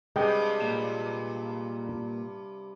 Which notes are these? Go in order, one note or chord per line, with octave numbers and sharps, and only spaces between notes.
G2 C3 G#3 G5
A#2